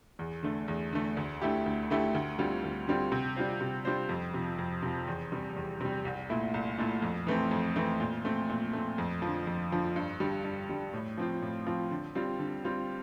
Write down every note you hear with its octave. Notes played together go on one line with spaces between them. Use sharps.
E2
D3 A3
E2
D3 A3
D2
D3 A3 E4 G4
D2
D3 A3 E4 G4
D2
D3 G3 C4 F4
D2
D3 G3 C4 F4
C3
G3 D4 F4 C5
C3
G3 D4 F4 C5
F2
C3 F3
F2
C3 F3
E2
C3 G3
E2
C3 G3
C2
A#2 A3 E4
C2
A#2 A3 E4
F2
E3 A3 C4
F2
E3 A3 C4
A#2
A3 C4
A#2
A3 C4
F2
D3 F3
F2
D3 F3
G2
D3 G3
G2
D3 G3
A2
F3 C4 F4
A2
F3 C4 F4
D3
G3 C4 F4
D3
G3 C4 F4